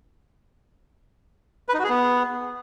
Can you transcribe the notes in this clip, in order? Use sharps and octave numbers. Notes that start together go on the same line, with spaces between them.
B4
D#4
F#4
G#4
B3